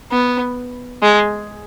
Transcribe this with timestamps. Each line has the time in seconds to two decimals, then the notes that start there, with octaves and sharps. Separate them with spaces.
0.11 B3
1.02 G#3